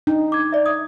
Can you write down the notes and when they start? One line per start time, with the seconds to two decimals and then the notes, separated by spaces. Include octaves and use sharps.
0.07 D4 D#4
0.32 D6 G#6
0.52 D5 E5
0.66 D#6 G#6